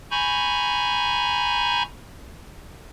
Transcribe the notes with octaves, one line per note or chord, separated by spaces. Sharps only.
G#5 A#5 B5 C#6 G6